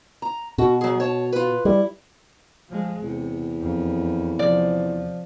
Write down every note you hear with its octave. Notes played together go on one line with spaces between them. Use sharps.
A#5
B2 F#4
F#3 G#4
C#5 A5
F4 B4
G3 E4
F3 G#3
E2 C3
F2
C3 F3 D5